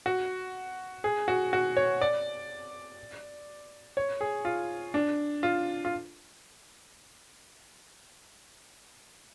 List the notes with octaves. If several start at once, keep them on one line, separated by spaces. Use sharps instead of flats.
F#4
G#4
F#4
F#4
C#5
D5
C#5
G#4
F4
D4
F4
F4